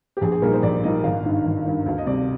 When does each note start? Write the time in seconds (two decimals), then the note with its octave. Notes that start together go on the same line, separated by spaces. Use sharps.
0.17 G4
0.21 A#1 G#4
0.32 G#4
0.42 A#2 G3 A#3 D#4 A#4
0.52 C5
0.63 A#1 D5
0.83 A#2 G3 A#3 D#4 D#5
1.04 G#1 F5
1.24 G2 D#3
1.45 G#1
1.65 G2 D#3
1.86 D2 F5
1.98 D#5
2.06 C3 G3 C4 D5